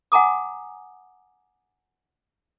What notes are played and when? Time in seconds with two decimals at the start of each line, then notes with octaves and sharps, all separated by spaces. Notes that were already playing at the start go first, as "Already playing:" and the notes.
0.12 F#5 G#5 A#5 D6 D#6